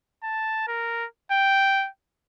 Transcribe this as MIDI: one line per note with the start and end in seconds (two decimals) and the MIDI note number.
0.24 0.65 81
0.68 1.06 70
1.32 1.88 79